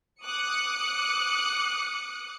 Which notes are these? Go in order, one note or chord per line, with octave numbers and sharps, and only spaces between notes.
D6 D#6 F#6 C#7